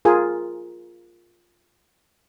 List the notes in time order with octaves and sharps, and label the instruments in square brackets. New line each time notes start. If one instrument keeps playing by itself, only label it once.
[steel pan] F4 G#4 A#4 G#5